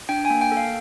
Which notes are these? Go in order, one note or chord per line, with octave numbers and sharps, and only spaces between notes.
D4 G5
G#5
A#3
G5
A4
F5